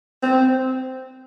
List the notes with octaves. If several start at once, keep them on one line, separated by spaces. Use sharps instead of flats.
C4